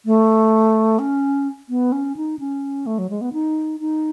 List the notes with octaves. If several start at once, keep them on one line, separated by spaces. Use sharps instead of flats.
A3
C#4
B3
C#4
D#4
C#4
A3
F#3
G#3
B3
D#4
D#4